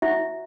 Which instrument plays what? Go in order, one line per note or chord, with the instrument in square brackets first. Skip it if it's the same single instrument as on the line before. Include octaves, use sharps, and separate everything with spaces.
[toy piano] E4 E5 [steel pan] F#4